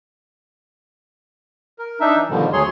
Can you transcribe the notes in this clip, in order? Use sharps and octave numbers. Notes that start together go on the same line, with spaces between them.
A#4
D4 D#4 E5
E3
G#2 B2 D3 D#3 F3 G3
D2 F#3 G#4 C#5 C6